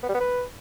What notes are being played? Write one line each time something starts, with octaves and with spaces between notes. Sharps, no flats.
B3
G3
B3
B4